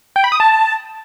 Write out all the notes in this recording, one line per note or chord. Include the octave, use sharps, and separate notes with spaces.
G5
B5
D#6
A5